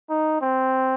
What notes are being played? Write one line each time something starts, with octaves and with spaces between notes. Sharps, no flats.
D#4
C4